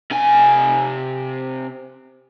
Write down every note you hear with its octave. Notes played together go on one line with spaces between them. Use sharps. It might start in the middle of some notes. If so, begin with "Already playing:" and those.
C3 G#5